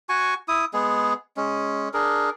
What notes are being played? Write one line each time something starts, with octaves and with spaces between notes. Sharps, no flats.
F#4 G#5 C#6
E4 D#6
G#3 B3 G#4
G#3 C#4
D4 G#4 A#4